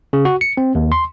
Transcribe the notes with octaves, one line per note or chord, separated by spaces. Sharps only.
C#3
F#4
C#7
C4
D#2
C6